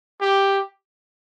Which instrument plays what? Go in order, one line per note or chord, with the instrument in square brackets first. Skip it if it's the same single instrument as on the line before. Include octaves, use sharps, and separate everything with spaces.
[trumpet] G4